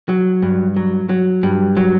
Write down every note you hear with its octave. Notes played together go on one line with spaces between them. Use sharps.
F#3
G2
F#3
F#3
G2
F#3